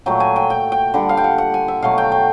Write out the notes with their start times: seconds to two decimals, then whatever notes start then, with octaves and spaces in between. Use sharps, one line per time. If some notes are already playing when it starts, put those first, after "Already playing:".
0.06 A#2 F#3 A3 G5
0.20 G#5
0.36 G5
0.50 G5
0.72 G5
0.94 D3 G3 F#5
1.09 F5
1.17 G5
1.24 F#5
1.38 F#5
1.54 G#5
1.68 E5
1.82 B2 F#3 A3 F5
1.98 G5
2.12 G5